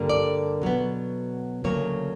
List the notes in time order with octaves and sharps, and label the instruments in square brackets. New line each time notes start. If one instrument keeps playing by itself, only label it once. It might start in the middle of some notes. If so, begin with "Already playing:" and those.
Already playing: [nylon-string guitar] G2 D3 G3 A#3
D5
B2 F#3 B3
D2 C#3 F#3 A#3 C#5